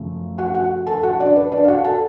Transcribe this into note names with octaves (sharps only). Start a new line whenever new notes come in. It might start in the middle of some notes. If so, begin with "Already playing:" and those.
Already playing: F#2 C#3 F3 A3
F#4 F#5
F#4 F#5
A4 A5
F#4 F#5
D4 D5
B4
D4 D5
F5
F#4 F#5
A4 A5